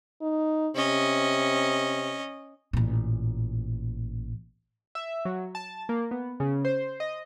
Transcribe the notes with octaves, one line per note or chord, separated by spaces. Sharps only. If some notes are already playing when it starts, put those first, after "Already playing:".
D#4
C3 C#4 D#5
A1 A#2
E5
F#3
A5
A#3
B3
C#3
C5
D#5